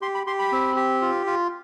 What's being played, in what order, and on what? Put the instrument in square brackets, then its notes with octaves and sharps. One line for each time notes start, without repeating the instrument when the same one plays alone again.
[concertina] G4 C6
B5
G4 C6
B5
C4
G4
F4
F4